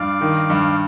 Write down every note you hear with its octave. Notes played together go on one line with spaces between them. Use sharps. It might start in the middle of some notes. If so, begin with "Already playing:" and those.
Already playing: G2 D5 F5
D#3
G2